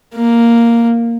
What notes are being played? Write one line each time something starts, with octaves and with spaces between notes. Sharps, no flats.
A#3